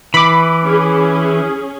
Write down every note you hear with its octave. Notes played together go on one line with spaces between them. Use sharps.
E3 B5 D6
C#4 G#4